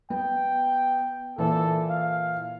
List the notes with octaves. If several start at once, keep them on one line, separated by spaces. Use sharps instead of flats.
B3 G5
A#2 E3 A4
F5